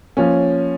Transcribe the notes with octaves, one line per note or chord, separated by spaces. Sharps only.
F3 A#3 C#4